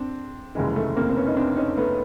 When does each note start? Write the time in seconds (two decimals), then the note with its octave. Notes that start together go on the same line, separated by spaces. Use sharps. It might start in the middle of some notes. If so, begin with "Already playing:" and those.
Already playing: C4 D4
0.55 F1 D#2 C#3 E3 G#3
0.76 A3
0.96 A#3 C4
1.09 C4
1.16 B3 C#4
1.27 D#4
1.37 C4 D4
1.57 C#4 D#4
1.77 A3 B3